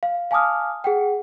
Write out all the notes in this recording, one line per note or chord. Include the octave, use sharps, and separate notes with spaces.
F5
F5 G#5 A5 D6 D#6 F6
G#4 F#5 G5